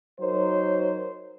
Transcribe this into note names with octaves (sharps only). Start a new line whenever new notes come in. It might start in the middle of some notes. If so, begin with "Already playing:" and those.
F#3 D#4 A#4 C5 C#5